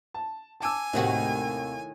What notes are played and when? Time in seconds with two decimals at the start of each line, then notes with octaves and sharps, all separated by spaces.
0.14 A5
0.60 G#5 A5 D6 E6
0.93 D#2 A2 C3 D#3 F#4